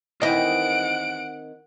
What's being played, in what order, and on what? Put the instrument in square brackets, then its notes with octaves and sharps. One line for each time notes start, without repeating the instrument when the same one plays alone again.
[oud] D#3 C4 D#4 [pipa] E3 D#5 [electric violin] F#5 D7